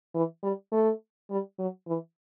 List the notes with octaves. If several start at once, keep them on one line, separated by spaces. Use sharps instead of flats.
E3
G3
A3
G3
F#3
E3